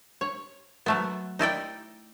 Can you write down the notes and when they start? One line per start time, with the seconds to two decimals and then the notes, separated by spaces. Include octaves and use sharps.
0.21 C#5
0.86 F#3 A3 B3
1.39 D#4 E4 D5 G5